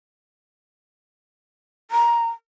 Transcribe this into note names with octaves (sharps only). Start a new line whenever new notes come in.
A#5